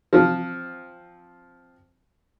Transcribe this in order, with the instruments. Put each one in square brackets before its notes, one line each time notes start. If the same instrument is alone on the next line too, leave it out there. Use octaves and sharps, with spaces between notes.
[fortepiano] F3 C4